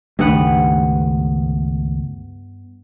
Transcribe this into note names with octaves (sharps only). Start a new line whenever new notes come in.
C#2 G2 D#3 A3 B3 F#5